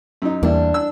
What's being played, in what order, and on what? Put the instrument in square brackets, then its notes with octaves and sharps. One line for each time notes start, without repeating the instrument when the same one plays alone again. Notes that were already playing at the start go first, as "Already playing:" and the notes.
[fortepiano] F#2 D#4
[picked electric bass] E2 A#3 [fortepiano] G3 E4 [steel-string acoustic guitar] D4
[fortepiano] E6